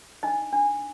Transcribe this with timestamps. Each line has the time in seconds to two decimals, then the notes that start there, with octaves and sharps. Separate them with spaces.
0.23 D4 D#4 D#5
0.53 D4